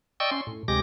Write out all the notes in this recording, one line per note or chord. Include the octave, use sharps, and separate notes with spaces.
D5 D#5 G5 C#6 E6
C#4 C6
A2
D2 C3 G#3 G4 D6 A#6